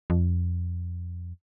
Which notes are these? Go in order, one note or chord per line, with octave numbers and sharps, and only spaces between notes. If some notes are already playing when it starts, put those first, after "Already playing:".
F2